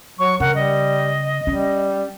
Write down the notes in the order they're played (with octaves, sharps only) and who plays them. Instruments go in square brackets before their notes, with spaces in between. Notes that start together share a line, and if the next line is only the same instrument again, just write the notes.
[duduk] F#3 [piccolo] C#6
[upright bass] C#3 [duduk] A#4 [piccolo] F#5
[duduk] G3 [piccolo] D#5
[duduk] G3 [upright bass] C#4